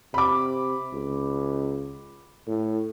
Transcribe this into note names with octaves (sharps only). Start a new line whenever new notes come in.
C3 B5 D6
C#2
A2